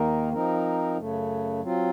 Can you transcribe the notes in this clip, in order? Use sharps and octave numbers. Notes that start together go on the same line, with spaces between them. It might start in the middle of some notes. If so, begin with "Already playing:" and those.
Already playing: D#2 D#3 A#3 D#4 A#4
F3 C4 D#4 A#4
F#2 C#3 A3
F#3 C4 F4